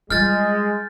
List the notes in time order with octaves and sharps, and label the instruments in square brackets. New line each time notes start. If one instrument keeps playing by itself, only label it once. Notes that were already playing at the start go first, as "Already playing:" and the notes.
[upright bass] G3 F4 [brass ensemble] G#3 [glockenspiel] F6 G6 A6